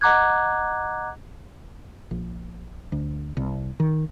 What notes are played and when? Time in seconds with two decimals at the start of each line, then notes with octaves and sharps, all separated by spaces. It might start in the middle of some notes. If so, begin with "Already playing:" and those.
0.01 D#5 F#5 A#5 D6 F#6 G#6
2.11 A#1
2.92 D2
3.37 C2
3.80 D#3